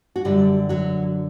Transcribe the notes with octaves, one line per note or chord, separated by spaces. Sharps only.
F#4
F#2 D3 F#3 G3 G4
F#3 F#4